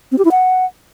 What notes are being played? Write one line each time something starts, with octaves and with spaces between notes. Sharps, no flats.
C4
G4
E4
F#5